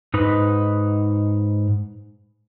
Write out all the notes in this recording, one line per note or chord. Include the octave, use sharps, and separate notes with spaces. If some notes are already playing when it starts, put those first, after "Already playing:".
G#2 D#4 B4